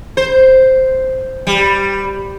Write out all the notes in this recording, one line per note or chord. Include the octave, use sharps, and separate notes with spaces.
C5
G3